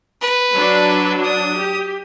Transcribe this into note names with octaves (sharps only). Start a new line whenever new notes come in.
B4
F#3 D4
D#6
G4